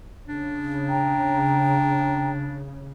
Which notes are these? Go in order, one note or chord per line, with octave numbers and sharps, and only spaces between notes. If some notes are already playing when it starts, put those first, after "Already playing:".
C#3 D4
G5 A#5